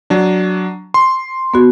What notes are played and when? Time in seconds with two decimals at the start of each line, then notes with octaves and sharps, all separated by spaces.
0.10 F#3 D4
0.94 C6
1.54 B3 F#4